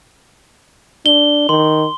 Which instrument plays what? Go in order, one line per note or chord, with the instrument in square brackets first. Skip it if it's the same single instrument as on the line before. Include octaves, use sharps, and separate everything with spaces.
[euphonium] D4 [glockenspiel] G7
[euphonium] D#3 [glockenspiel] C6